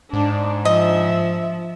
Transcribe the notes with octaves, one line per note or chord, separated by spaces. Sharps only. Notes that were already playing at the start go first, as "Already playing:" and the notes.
G#2 D4
F3 D#5 E5